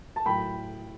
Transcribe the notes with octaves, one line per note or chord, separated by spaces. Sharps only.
A5
A2 F#3 G5 B5